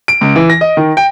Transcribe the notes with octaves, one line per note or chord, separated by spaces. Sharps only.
D7
C#2
E3
A#6
D#5
D#3
G5